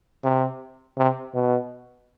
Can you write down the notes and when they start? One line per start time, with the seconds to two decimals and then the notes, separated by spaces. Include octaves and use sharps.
0.24 C3
0.98 C3
1.34 B2